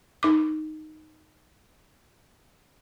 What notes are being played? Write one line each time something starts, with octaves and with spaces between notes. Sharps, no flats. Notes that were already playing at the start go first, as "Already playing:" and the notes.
D#4 D6